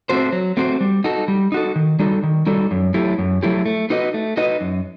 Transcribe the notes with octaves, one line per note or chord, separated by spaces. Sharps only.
A3 C4 F#4 C5
F#3
A3 C4 F#4 C5
G3
D#4 F#4 A4
G3
D#4 F#4 A4
D#3
G3 D#4 F#4 A4
D#3
G3 D#4 F#4 A4
F#2
F#3 A3 E4 G4
F#2
F#3 A3 E4 G4
A3
D#4 F#4 B4 D#5
A3
D#4 F#4 B4 D#5
F#2